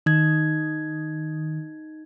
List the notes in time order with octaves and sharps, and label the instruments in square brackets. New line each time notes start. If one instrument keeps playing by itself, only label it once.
[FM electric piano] D#3 [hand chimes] D#4 G#6